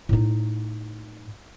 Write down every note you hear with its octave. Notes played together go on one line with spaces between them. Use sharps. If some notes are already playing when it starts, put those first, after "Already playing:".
A2 D#4